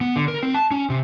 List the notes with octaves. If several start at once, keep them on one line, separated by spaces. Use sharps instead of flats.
B3
D3
A#4
C4
A5
C#4
C3